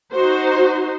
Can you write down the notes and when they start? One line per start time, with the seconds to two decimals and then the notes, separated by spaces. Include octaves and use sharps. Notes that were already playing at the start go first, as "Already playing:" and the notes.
0.13 D#4 F#4 C5